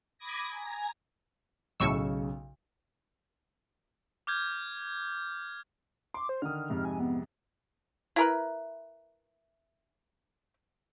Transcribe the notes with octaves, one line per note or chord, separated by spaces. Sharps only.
B5 D6 D#6 G#6 A#6
G#5 A#5
B1 A2 C#3 C#6 E6
D6 F6 G6 G#6
C6 D6
C5
D3 D#3 D#6 F6
F2 G#2 C3
G#5
B3
E4 A#4 B4